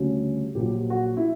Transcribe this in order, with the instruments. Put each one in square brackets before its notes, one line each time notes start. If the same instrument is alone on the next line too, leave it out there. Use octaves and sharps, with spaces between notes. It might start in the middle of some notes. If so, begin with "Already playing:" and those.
Already playing: [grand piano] D2 C#3 G3
A#1 A#2 F#3 G4
F#4
E4